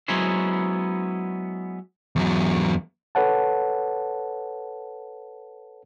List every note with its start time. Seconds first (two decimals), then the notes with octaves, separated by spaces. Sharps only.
0.08 F#3 G#3 B3 C#4 E4 C5
2.16 E2 F#3
3.15 A4 B4 C#5 F#5 A5